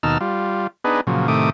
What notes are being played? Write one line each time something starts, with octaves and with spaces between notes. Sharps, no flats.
D#2 B2 D#4 A5 E6 F6
G3 F4
B3 D4 D#4 G#4 B4
A#2 C#3 F3 F#3
A2 C3 D#3 A3 D6 D#6